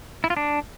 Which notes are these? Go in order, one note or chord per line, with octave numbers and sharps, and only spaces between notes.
E4
F4
D4